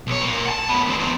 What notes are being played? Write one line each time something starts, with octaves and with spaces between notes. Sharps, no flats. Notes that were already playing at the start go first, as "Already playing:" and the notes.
B1 C#5
A#2 A#3
F#5 A5
F#2 B3
D2 C4
E2 F3